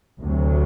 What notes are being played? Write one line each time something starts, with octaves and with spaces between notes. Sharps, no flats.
D2 C3 F#3